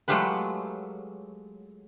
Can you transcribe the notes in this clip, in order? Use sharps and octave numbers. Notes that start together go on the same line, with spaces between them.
F#3 G#3 A3 F4 G4 B4